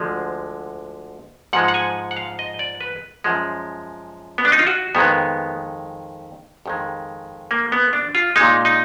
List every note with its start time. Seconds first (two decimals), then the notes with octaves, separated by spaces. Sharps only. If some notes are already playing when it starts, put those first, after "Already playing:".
Already playing: D2 D3 F3 G#3
1.53 G#2 F3 G#3 F#5
1.68 F#5
1.74 G#5
2.11 F#5
2.16 F5
2.39 D#5
2.59 D5
2.81 B4
3.24 F#2 F3 G#3
4.38 B3
4.45 D4
4.52 D#4
4.59 F4
4.67 F#4
4.95 F2 D#3 G#3 B3
6.66 F2 D#3 G#3
7.51 A#3
7.72 B3
7.93 D4
8.15 F4
8.36 A#2 G#3 D#4
8.65 D#4